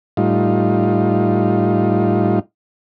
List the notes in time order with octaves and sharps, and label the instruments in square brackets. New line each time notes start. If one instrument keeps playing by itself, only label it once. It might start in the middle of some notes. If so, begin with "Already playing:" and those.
[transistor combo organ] A2 G3 D#4 F4